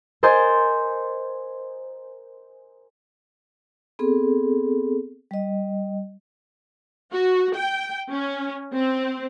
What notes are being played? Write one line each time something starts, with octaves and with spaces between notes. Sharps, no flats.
A#4 C5 D#5 G#5 G6 A6
B3 C4 G#4 A4
G3 D#5
F#4
G5
C#4
C4